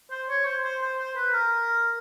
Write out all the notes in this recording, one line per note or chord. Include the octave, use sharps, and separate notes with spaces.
C5
C#5
C5
C5
C5
C5
B4
A#4